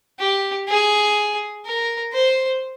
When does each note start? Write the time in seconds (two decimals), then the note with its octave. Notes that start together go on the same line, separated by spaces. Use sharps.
0.19 G4
0.68 G#4
1.65 A#4
2.13 C5